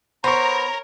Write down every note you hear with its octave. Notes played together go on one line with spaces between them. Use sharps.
B3 A#4 C5 C#5 A#5 C#6